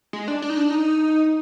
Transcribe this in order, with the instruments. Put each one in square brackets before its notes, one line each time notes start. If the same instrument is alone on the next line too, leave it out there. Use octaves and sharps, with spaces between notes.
[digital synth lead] G#3
D4
D4
D#4
D4
D#4